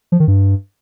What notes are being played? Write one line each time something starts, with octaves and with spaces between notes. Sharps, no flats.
F3
D#3
G2